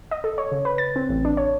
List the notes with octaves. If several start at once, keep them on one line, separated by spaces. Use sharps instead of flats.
D#5
A4
C#5
C#3
B4
A6
C4
A1
D4
C#5